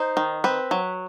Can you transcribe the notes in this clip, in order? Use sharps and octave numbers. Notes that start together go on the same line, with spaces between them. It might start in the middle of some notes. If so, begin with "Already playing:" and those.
Already playing: D#4 C5
D#3
C4 B4
F#3